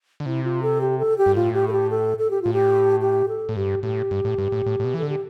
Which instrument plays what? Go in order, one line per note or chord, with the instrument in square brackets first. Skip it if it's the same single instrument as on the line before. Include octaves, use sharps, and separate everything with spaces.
[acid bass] D3
[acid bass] C3 [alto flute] E4
[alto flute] F4
A4
G4
A4
G4
[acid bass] G2
[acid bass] A2 [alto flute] F4
[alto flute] G4
A4
G4
A4
A4
G4
[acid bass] A2 [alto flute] F4
[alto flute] G4
G4
A4
[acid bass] A2
[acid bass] G2 [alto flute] G4
[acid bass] A2 [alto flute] G4
[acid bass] G2
A2
G2
A2
A2
A2
B2
E3
[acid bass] D3 [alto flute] A4
[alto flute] G4